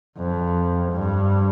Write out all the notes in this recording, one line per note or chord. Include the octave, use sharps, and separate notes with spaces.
F2
G2